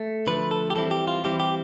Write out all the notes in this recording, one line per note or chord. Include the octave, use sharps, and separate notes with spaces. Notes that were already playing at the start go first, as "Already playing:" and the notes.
Already playing: A3
D3 F3 A3 B4
A4
G4
E3 G3 C4 E4 A4
G4
F4
E3 G3 C4 E4 G4
G4